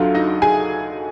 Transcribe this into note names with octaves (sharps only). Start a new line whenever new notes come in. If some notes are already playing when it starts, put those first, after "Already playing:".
Already playing: D2 D3 F#3 F4 F5
D#4 D#5
G#4 G#5